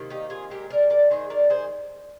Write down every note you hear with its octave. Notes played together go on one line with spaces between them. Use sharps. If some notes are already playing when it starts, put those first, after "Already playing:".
Already playing: C3 D#3 A#3
D#4 G4
F4 G#4
A#2 G#3 G4 A#4
A#4 D5
A#4 D5
D#3 G#3 G#4 C5
A#4 D5
G#4 C5